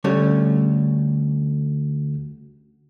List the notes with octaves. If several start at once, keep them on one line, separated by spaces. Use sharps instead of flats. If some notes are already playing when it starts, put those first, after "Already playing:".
D2 G3 A3 C#4 C#5